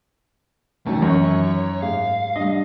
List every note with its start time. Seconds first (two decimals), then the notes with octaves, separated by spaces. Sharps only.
0.87 D#2 D#3 E3 F#3 A3
1.02 F#2 C#5
1.82 G#2 F5
2.36 G3 D4 D#5